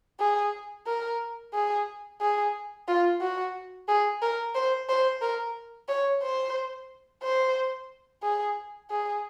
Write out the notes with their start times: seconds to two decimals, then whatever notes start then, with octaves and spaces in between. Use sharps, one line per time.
0.20 G#4
0.87 A#4
1.54 G#4
2.21 G#4
2.88 F4
3.21 F#4
3.88 G#4
4.22 A#4
4.55 C5
4.89 C5
5.22 A#4
5.88 C#5
6.22 C5
7.23 C5
8.23 G#4
8.90 G#4